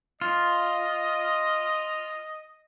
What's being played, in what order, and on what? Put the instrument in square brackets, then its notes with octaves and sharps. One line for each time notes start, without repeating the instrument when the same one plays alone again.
[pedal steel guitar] F4 [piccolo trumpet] D#5